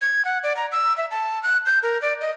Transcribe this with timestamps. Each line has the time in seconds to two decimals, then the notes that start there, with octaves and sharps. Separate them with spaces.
0.01 G#6
0.25 F#5
0.43 D5
0.57 A#5
0.72 E6
0.97 E5
1.11 A5
1.43 F#6
1.66 G6
1.83 A#4
2.02 D5
2.21 D#5